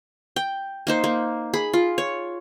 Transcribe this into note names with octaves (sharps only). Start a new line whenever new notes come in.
G5
A#3 D#4 C5
A#3
G#4 B5
F4
C#5